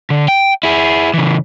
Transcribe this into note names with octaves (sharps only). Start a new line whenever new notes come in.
D3
G5
E4 G#4
C#3 E3